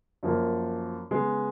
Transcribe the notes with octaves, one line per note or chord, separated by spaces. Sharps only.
F#2 F3 A#3
C#3 G#3 B3